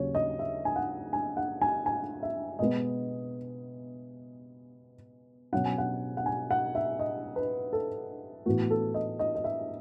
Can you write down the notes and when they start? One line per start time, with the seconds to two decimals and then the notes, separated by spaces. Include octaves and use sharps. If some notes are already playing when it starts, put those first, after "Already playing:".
Already playing: D#2 C#3 F#3 C#4 C#5
0.15 D#5
0.39 E5
0.65 G#5
0.76 F#5
1.13 G#5
1.37 F#5
1.61 G#5
1.86 G#5
2.23 E5
2.59 B2 G#3 B3 D#5
5.52 B2 F#3 C#4 F#5
5.65 G#5
5.78 F#5
6.17 F#5
6.26 G#5
6.51 F#5
6.75 E5
6.99 D#5
7.36 B4
7.73 A4
8.46 A2 E3 B3 F#4
8.70 A4
8.94 D#5
9.19 D#5
9.35 D#5
9.44 E5